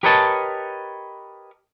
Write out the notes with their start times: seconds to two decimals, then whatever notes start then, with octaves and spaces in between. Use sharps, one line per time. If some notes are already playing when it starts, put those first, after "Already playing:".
0.03 G4 A#4 B4 C#5 D#5 A5